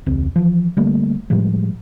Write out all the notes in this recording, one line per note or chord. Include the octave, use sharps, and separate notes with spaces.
E1 C#2 C4
E3 F3
D3 G3 A3 A#3
A2 F3 G3 G#3